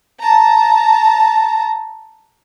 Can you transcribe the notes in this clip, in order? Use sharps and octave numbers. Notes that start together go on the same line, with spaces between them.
A5 A#5